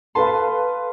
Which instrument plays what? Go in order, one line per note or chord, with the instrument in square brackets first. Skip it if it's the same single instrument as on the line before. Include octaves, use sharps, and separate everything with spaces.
[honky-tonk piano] A4 B4 F5 [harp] A5 C6